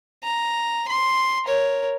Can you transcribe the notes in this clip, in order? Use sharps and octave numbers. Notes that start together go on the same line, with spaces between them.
A#5
C6
A#4 C#5